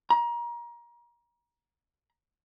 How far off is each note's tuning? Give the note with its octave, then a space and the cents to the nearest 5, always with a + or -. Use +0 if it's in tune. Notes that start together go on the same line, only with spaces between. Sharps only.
A#5 +30